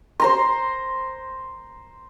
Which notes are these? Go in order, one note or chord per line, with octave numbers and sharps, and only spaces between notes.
C5 A#5 C6